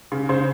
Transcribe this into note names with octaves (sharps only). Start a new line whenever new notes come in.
C#3
C#3 C5